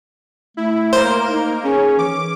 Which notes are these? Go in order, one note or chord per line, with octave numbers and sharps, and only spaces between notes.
A3 E4
A#3 A#4 C5
D#4
C#4 G#4
E3 D6